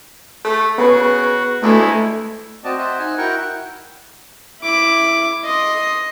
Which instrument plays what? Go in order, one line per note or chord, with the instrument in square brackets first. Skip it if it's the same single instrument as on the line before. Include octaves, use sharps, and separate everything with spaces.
[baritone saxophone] A3
[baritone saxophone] C#3 [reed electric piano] B3 B4 [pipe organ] F#4
[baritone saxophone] D2 [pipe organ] G#3 E4 [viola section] A3
[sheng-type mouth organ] C4 F#4 D5 D#5 A5
C5 D#5 E5 F#5
D#4 F#5 G#5
E4 F#4 A#4 F#5 G5 C#6
[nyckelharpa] E4 D6
D#5 C6